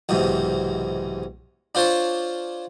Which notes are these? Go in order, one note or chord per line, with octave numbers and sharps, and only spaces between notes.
B1 E2 G#2 C3
D4 F4 C5 C#5 A5